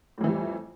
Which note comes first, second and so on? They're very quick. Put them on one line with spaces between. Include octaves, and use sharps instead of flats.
A2 F2 E3 G3